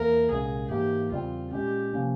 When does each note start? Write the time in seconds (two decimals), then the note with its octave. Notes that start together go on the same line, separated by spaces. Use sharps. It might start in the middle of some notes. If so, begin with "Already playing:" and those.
Already playing: E2 E3 A#3 A#4
0.30 C2 A#2 G#3 C#4 G#4
0.70 G#2 E3 A#3 G4
1.12 E2 C#3 G3 C4 F4
1.52 A#2 G#3 C#4 G4
1.93 C3 F3 A#3 C#4